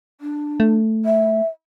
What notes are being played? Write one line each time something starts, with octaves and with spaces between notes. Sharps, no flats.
D4
A3
E5